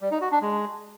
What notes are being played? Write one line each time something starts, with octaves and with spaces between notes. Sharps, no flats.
G3
D#4
F#4
D4
G#3